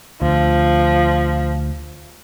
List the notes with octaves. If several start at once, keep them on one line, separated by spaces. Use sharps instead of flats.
D2 F3